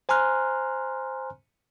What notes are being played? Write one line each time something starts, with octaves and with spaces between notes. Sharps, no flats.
C5 G#5 A#5 C6 F6 F#6